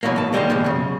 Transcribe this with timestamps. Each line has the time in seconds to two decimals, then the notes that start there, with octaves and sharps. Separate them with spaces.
0.03 B2 E3 F#3 A3 A#3
0.16 G#2 A5
0.33 D#2 G3 G#3 A#3 C5
0.50 B2 D3 E3 F3
0.64 F#2 C#3